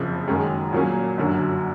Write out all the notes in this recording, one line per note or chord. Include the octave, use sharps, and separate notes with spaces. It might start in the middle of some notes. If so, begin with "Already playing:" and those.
Already playing: F#1 F2 C#3 F3
F#2 D#3 G#3 C#4
A#2 F#3 A#3 C#4
G1 F#2 D3 F#3